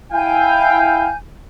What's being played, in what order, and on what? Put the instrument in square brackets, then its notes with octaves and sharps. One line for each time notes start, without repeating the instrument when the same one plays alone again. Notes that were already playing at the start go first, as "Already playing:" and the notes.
[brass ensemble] E4 F5 G5 [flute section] G#5 G6